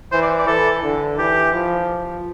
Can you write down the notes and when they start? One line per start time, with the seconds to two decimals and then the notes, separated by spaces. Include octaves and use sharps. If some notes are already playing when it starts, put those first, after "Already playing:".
0.12 E3 C5
0.22 D5
0.39 D5
0.47 E3 A4
0.83 D3
1.18 E3 G4
1.54 F3